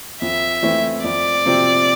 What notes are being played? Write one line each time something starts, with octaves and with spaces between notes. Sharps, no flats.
F2 E5
E3 A3 C4 E4
F2 D5
C3 F3 C4